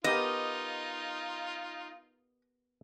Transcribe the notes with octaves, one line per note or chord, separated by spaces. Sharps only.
B3 D#4 F4 G4 A#4 D#5